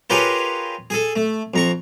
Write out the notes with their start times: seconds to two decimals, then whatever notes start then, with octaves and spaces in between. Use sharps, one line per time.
0.10 F4 G4 G#4 A#4 B4 C#5
0.90 G#4 A4
1.16 A3
1.54 F2 A#5 C#6